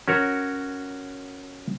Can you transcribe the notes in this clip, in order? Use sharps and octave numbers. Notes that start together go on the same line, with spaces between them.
C#4 F#4 A#4 C#5